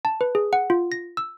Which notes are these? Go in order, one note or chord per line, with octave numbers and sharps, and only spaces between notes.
A5
B4
G#4
F#5
F4
A#6
E6